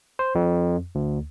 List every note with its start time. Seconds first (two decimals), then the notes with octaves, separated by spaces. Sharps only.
0.19 C5
0.35 F2
0.95 D2